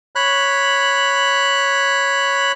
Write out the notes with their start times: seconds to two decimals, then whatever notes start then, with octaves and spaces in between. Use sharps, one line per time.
0.15 C#5 B5 F#6